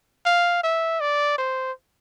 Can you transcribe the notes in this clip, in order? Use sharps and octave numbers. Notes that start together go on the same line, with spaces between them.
F5
E5
D5
C5